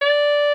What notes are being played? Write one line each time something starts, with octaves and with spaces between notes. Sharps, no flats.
D5